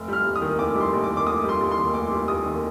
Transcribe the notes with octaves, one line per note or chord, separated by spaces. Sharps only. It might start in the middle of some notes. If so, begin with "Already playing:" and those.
Already playing: F1
G3 F6
D#2
D#6
D#3
F1 D6
G3
C6
D#2
D6
D#3
D6
F1 D#6
G3
C6
D#2
C6
D#3
F1 D6
G3
D#2 D#6
D#3